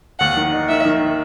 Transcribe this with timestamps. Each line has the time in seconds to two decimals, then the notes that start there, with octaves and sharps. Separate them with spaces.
0.20 D#2 F#5
0.36 D#3
0.53 D#4
0.69 D#3 E5
0.85 D#3